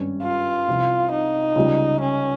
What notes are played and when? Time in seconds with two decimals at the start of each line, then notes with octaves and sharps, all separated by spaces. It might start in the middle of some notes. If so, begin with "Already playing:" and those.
Already playing: G#1 G2 G3 C#4
0.23 F4
0.68 C2 C3 F3
1.11 D#4
1.55 C#2 C#3 G3
2.00 C#4